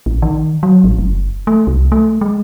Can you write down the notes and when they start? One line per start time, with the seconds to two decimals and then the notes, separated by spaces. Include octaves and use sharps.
0.06 A#1
0.22 D#3
0.63 F#3
0.84 A1
0.99 F#1
1.47 A3
1.67 C2
1.92 A3
2.21 G#3